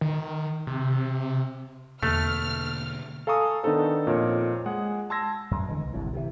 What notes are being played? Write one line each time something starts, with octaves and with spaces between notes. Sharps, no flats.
D#3
C3
E2 B2 D3 A3 A#3 F6
A4 F5 G#5 A#5 C#6 D#6
D#3 B3 D4 D#4 A4 C5
F2 A#2 A#4 C#5 D#5
G#3 G#4 F#5
A5 C6 E6 G#6 A#6
F#2
D3 E3 G#3
C2
G1 C2 A2
C3 D#3 E3